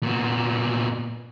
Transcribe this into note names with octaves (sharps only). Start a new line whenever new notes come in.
A#2 B3